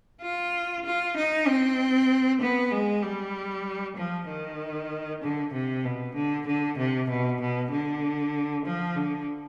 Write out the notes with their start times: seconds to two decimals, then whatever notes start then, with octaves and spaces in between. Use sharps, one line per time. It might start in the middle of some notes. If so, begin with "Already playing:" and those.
0.22 F4
0.85 F4
1.16 D#4
1.48 C4
2.41 B3
2.72 G#3
3.02 G3
3.96 F3
4.28 D#3
5.22 D3
5.53 C3
5.85 B2
6.15 D3
6.47 D3
6.78 C3
7.09 B2
7.40 B2
7.72 D3
8.65 F3
8.96 D3